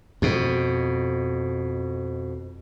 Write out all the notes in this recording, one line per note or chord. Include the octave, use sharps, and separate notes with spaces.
F2 B2